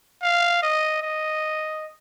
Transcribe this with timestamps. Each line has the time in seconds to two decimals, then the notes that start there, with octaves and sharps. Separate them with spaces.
0.23 F5
0.62 D#5
1.02 D#5